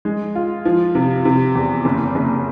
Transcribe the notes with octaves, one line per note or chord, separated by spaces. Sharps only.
G#3
F4
F3
C3
C3
E2
F#1
F#1